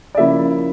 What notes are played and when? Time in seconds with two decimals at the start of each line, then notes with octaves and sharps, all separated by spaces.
0.15 D5
0.17 C#3 F3 A#3 E4 E5